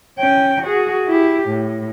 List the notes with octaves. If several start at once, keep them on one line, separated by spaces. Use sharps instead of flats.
C#4 G5
F#4 G#4
E4 G4
A2